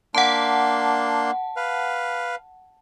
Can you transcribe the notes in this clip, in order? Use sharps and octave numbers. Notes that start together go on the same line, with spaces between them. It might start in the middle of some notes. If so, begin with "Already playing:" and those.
A#3 D4 F#5 A5 C6
B4 F5